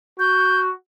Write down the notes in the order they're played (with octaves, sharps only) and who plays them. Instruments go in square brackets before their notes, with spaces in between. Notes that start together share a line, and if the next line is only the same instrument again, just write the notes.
[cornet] F#4 [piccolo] G6